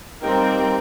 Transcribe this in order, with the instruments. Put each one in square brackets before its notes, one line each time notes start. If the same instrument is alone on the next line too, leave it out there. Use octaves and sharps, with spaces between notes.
[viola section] G3 C4 [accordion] A#3 D#4 G5 [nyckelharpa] A#4